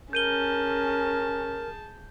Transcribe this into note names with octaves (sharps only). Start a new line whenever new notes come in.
C#4 G#4 A#4 A5 G6 D#7 G7